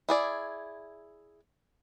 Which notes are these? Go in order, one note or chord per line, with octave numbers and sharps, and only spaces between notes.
E4 G#4 D5